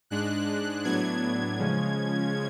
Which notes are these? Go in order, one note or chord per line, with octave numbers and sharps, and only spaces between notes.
G#2 G#3 D4 F#6
A2 F#3 B3 D4 G#6
C#3 F3 G#3 C#4